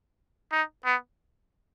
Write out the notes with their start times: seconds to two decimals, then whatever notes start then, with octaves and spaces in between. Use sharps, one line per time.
0.52 D#4
0.86 B3